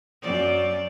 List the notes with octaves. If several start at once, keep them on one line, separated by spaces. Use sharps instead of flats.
F#2 D5